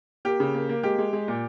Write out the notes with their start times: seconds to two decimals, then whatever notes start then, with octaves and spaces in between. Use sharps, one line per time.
0.25 A#3 G4
0.40 C#3
0.54 A#3
0.69 A#3
0.83 G#3 G4
0.98 G#3
1.13 G#3
1.28 A#2